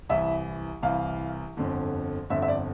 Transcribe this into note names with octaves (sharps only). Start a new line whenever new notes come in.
C2 C3 E3 E5
C2 C3 E3 F5
G1 F2 D3
G1 F2 D3 E5
E5
D5